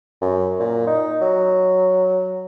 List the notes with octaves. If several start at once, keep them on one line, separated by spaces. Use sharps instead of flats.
F#2
A#2
D#4
F#3